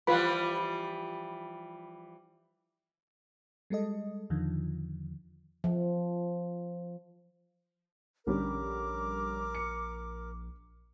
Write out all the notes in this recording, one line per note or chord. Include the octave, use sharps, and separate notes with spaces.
E3 F3 G3 F4 B4 B5
G3 G#3 A4 D#5
E2 D3 D#3 F3
F3
A#1 D3 G3 C#4 A#4 D6
C#7